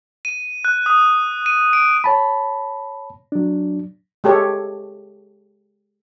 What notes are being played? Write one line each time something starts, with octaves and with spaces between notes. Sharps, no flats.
D#7
F#6
D#6
D#7
D7
C#5 A5 B5
F#3 D4
G#3 G4 A4 C#5